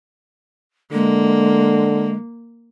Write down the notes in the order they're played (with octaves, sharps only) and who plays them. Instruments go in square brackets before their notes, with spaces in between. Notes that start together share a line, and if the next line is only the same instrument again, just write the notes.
[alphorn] D3 [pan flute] G#3 [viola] A#3